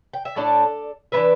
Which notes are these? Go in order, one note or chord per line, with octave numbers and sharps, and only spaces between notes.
G5
E5
A2 A3 D4 A4 D5
E3 B3 D4 B4 E5